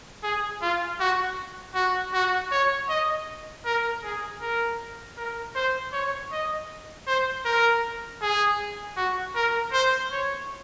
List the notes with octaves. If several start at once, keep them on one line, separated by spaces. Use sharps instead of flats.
G#4
F4
F#4
F#4
F#4
C#5
D#5
A#4
G#4
A#4
A#4
C5
C#5
D#5
C5
A#4
G#4
F#4
A#4
C5
C#5